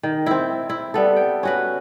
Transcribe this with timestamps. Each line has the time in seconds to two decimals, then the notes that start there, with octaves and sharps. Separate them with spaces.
0.03 D#3
0.26 C4 E4
0.69 E4
0.94 G3 B3 A4
1.16 G5
1.43 C#4 F#4 B4